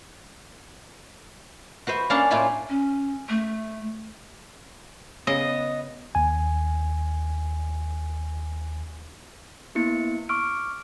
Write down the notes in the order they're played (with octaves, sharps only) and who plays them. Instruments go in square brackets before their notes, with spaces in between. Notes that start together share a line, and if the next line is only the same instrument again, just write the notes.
[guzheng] F#4 B4 C5 E5
A#3 C#4 D4 F5 F#5 A5
A2 A3 A#3 F4 G#5 B5
[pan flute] C#4
A3
[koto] C#3 [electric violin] B3 [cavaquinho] D#5
[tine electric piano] D#2 G#5
[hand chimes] A#3 B3 E4 C#7
C#6 D6 F6 D7